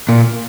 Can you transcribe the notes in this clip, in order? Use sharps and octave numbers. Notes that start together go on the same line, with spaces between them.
A#2